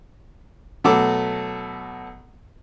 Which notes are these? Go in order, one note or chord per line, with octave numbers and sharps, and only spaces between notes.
B2 F#3 A3 F#4 A4 D6